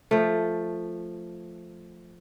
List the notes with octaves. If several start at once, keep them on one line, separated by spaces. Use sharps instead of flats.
F3 A3